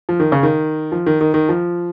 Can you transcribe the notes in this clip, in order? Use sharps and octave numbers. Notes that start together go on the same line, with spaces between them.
F3
D#3
C#3
D#3
F3
D#3
D#3
D#3
F3